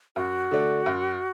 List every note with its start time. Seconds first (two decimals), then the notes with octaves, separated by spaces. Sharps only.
0.16 F#2 F#4
0.51 D3 A3 D4
0.86 F#2